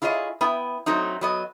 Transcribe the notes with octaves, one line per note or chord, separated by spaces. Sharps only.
E4 F4 G#4 C#5 D#5
B3 E4 G5
F#3 A3 C4 D#4
F#3 B3 D#5